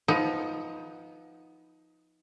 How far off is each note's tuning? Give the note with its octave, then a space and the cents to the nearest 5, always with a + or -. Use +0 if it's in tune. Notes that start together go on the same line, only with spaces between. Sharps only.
F3 +0 B3 +0 D#4 +20